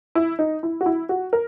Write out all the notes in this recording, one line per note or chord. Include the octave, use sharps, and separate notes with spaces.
E4
D#4
E4
F#4
E4
F#4
A#4